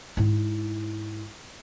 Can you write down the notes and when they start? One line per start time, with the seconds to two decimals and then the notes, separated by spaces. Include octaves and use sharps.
0.17 G#2 E4